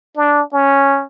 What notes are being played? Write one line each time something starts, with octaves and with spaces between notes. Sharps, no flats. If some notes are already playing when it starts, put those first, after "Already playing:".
D4
C#4